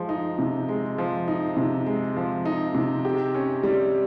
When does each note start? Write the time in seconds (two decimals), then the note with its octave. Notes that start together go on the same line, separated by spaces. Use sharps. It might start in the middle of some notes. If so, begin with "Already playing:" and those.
Already playing: F3 G#3
0.09 D#4
0.39 C3
0.69 G#3
0.98 F3
1.28 D#4
1.57 C3
1.86 G#3
2.16 F3
2.45 D#4
2.75 C3
3.05 G4
3.35 C#4
3.63 G3